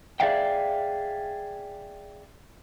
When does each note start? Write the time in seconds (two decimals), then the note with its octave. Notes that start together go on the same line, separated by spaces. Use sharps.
0.20 G#4 A#4 D5 E5 F5 G5